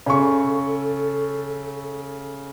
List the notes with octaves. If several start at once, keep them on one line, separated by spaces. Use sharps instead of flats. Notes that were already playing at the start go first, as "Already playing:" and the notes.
C#3 A4 C#6